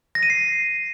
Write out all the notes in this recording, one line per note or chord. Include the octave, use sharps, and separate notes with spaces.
A#6
D#7
C7